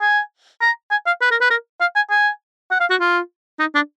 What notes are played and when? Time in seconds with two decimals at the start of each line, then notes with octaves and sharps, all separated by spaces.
0.01 G#5
0.62 A#5
0.91 G#5
1.06 F5
1.21 B4
1.31 A#4
1.41 B4
1.50 A#4
1.81 F5
1.96 G#5
2.10 G#5
2.71 F#5
2.80 F5
2.90 F#4
3.00 F4
3.60 D#4
3.75 D4